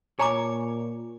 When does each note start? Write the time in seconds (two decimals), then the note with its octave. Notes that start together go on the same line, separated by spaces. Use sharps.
0.19 A#2 C#5 G#5 A#5 D6